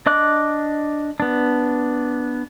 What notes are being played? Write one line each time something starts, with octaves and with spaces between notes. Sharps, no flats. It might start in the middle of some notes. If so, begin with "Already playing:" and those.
D4 D#5 D6 F#6
B3 D4